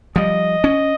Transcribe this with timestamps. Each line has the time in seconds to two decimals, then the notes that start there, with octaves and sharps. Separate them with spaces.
0.16 F3 G3 D#5
0.64 C#4